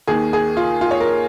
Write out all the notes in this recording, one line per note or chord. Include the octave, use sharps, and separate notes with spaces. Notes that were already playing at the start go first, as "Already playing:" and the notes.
D#2 D#3 G#4
G#4
F4
F4
C#5
A#4